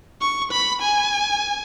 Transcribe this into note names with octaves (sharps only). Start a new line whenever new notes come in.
C#6
B5
G#5